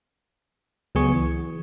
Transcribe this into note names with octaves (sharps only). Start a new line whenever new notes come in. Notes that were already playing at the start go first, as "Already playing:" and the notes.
C#2 F#3 B3 G#4 G#5 C#6
E3